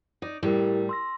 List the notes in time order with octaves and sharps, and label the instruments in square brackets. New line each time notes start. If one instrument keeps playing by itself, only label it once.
[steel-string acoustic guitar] D#4 D5
[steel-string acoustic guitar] A2 G3 [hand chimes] E4 G4 A#4
[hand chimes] C6 E6 A#6